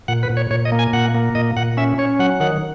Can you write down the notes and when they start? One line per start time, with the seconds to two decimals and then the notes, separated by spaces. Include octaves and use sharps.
0.08 A#2 F#5
0.23 B4
0.30 A#2
0.37 C#5
0.51 A#2 C#5
0.65 D#5
0.72 A#3
0.79 G#5
0.93 A#2 F#5
1.14 A#3
1.35 A#2 D#5
1.57 A#2 F#5
1.77 C#4 E5
1.98 C#4 C#5
2.19 F#3 F#5
2.40 D#3 F#5